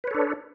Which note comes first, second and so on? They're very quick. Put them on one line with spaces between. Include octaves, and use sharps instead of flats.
B4 C#5 A4 D4